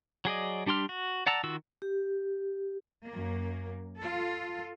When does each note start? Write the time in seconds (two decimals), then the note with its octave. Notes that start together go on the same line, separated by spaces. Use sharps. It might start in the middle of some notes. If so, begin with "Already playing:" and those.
0.25 F#3 G#4 D5 D#5
0.66 G3 D4 G4 C6 F6
0.89 F#4
1.27 D5 F#5 A5 A#5 E6
1.44 D#3 F4 F#4 E6
1.82 G4
3.07 F#2 A#3
4.00 F4 A4